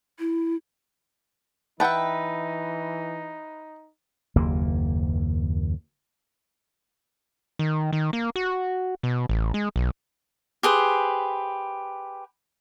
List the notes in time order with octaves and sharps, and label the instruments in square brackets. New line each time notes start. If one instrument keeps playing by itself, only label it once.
[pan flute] E4
[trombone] E3 [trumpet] D#4 [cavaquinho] B4 E5 [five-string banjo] F#5 G5 A5
[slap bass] F#1 D#2 A#3
[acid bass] D#3
D#3
A#3
F#4
B2
A1
G#3
B1
[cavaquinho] G4 G#4 B4 C5